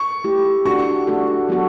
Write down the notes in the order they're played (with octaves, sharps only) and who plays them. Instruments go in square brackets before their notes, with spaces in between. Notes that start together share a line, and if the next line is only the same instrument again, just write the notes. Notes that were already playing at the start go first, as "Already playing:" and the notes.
Already playing: [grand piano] C#6
[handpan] A3 E4 G4
[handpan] A3 D4 F#4 A4 [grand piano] C#6
[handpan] A3 D4 F#4 A4
F#3 B3 F#4 A4